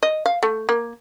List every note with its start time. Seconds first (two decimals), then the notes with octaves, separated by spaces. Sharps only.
0.03 D#5
0.26 F5
0.43 A3
0.69 A#3